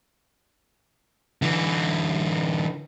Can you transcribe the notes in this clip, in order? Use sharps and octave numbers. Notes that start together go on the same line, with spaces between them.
D3 E3